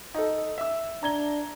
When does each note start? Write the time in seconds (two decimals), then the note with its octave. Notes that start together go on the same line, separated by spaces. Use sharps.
0.14 D#4 A4
0.58 E5 E6
1.03 D4 A#5 G#6 G7